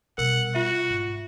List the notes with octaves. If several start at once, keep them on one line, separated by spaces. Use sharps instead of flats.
B2 G3 A#4 F#5
F4 F#4 E5
G#2